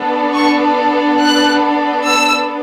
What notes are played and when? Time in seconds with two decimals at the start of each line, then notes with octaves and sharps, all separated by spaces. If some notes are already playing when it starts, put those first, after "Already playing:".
Already playing: B3 D4 A4
0.34 C#6
1.20 F#6
2.05 E6